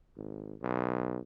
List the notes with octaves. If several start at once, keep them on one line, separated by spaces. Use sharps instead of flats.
G#1
B1